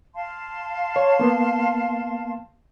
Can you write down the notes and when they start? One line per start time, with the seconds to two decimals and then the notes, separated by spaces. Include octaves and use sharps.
0.15 F5 A5 C6
0.96 C#5
1.19 A#3 B3